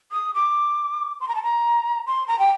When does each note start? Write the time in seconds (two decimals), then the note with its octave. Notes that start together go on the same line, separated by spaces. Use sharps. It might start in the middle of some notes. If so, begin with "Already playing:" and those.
0.12 D#6
0.34 D6
1.21 C6
1.28 A#5
1.35 A5
1.43 A#5
2.06 C6
2.28 A#5
2.39 G5